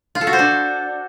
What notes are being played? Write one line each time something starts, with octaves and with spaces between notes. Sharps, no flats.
F4
A4
F#4
C5
D4